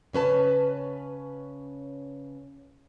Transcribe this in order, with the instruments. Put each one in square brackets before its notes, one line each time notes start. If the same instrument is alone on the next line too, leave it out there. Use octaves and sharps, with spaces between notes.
[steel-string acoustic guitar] C#3 C#4 B4 A5